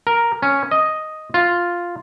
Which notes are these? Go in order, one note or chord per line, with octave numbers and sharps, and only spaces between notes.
A#4
C#4
D#5
F4